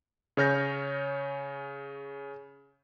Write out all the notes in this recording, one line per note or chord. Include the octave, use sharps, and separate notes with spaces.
C#3 G#4 C#5 F6 G6 A#6